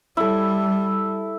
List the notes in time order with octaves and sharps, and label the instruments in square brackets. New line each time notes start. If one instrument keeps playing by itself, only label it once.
[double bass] G3 [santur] E4 A4